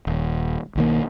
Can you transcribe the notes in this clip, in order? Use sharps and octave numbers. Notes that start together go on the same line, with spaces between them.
D#1
B1 D#3 A#3